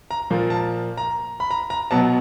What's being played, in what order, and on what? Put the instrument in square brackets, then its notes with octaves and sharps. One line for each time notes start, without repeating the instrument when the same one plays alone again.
[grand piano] A#5
A#2 F3 A#3
A5
A#5
B5
A#5
A#5
B2 F#3 B3 A5